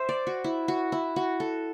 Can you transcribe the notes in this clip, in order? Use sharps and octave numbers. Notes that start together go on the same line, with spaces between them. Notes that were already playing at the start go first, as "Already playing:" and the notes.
Already playing: C5 E5
D5
F#4
E4
F#4
E4
F#4
A4